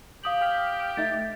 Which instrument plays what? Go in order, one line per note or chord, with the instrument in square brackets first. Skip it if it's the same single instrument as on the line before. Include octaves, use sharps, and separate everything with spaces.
[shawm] G4 [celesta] F5 D#6 F#7
[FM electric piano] G5 F6 B6
[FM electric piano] A3 D#4 [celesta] E5 A6